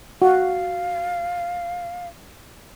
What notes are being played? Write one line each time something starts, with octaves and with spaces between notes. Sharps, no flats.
F#4 F5